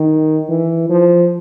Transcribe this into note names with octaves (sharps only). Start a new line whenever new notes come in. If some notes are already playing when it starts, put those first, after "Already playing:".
Already playing: D#3
E3
F3